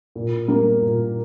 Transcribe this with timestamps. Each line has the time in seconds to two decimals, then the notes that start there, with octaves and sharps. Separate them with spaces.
0.15 A#2
0.48 G3 A#3
0.82 A#2